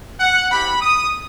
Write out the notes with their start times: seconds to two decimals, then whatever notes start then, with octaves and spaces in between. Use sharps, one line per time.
0.20 F#5
0.50 C4 E4 G4 B5
0.81 D#6